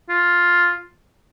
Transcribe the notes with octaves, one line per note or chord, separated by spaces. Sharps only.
F4